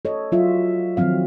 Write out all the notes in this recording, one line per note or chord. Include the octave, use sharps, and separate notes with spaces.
A4 C#5 D#5
F#3 F4 E5
D#3 F3 F#3 C4 F5